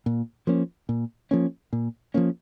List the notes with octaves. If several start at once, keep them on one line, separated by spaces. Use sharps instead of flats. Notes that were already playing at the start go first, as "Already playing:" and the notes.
A#2
F3 A#3 C#4
A#2
F3 A#3 C#4
A#2
F3 A#3 C#4